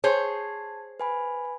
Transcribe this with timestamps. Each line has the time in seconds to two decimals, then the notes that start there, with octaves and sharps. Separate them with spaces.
0.04 G#4 C5 C#5 A5 G#6
1.00 B4 G#5 B5